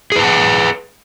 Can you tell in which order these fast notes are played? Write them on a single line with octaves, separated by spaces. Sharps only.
G#4 B4 A5 F#5